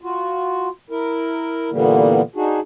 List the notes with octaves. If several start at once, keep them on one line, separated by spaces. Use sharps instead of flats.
F4 F#4
E4 A#4
A#2 D3 E3 G3 A#3 B3
D4 D#4 F#4 G#4